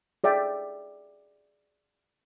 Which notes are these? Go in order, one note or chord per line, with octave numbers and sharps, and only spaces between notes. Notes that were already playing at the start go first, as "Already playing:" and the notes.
G#4 D5 E5 G5